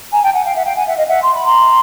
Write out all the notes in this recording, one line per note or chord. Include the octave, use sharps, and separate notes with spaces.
G#5 A#5
G5 A5
F#5 G#5
F5 G5
E5 F#5
F5 G5
F#5 G#5
E5 F#5
D#5 F5
E5 F#5
C6
B5
A#5 C6